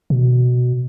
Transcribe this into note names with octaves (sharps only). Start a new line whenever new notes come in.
B2